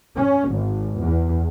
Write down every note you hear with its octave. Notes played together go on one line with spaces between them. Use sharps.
C#4
G#1
E2